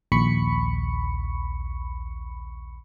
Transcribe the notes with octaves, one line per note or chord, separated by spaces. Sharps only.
A#1 D#2 B5 C#6 C#7